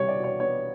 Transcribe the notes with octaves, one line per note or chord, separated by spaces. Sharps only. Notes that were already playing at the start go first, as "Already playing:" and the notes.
Already playing: C2 B2 G3 B3 C#5
D5
B2
C#5
B3 C#5